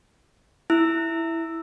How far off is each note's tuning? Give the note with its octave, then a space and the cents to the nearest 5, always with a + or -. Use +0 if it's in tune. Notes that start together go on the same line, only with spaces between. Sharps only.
E4 +0 E6 +0